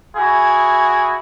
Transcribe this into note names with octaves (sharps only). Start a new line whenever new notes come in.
E4 F#4 G#4